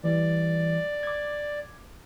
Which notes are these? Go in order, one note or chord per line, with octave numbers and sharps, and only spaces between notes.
E3 G3 D5
D6 G#6